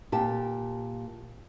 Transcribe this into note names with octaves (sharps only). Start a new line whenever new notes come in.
A#2 G4 A5